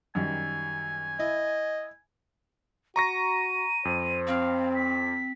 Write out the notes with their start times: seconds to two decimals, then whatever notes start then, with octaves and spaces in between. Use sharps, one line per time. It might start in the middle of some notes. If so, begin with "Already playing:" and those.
0.15 F#2 D#3 G3 G#5
1.19 E4 D#5
2.96 F#4 A#5 C#6 A#6 D#7
3.85 F2 C5
4.27 C4 F5
4.75 B6